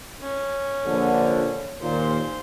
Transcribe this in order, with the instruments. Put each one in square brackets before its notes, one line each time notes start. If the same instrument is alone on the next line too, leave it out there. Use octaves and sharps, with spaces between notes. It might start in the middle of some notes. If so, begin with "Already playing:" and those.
[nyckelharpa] C#4
[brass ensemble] A#1 D3
[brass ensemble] D#2 A#2 [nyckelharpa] C5